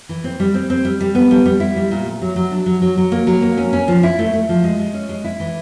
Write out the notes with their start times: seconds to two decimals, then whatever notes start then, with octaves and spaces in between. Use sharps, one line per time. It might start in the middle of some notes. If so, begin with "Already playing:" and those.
0.09 E3
0.24 C4
0.40 G3
0.54 C4
0.70 C4
0.85 G3
1.01 G3
1.15 B3
1.31 G3
1.46 G3
1.60 E4
1.76 G3
1.91 A#2
2.06 A3
2.22 F#3
2.36 F#3
2.51 D4
2.66 F#3
2.82 F#3
2.97 F#3
3.12 A#3
3.27 F#3
3.42 A#3
3.57 C#4
3.73 C#4
3.88 F3
4.03 E4
4.19 A3
4.33 A3
4.49 F3
4.64 G#3
4.79 G#3
4.94 C#4
5.09 G#3
5.24 E4
5.40 E3